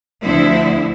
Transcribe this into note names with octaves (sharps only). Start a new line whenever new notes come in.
D2 D3 F3 C4 E4